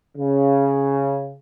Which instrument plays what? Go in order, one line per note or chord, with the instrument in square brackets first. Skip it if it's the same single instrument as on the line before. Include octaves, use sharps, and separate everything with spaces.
[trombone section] C#3